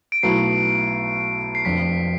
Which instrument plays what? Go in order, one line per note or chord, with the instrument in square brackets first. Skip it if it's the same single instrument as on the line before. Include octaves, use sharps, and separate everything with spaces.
[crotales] D7
[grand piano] B1 B2 A3 E4 [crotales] C7
[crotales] C7
[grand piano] F1 F2 D3 [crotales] B6